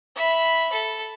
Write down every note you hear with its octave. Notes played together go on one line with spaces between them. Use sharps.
E5 B5
A4